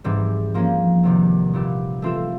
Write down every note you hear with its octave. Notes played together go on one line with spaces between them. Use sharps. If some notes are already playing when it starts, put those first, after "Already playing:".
G#2 E3 G3 C4
F3 A#3 C#4
E2 C3 D#3 G3
A#2 G3 B3 E4 G4
E3 A3 C4 F4 A4